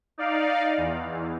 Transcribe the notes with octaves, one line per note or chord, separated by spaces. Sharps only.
D#4 D5 F5
E2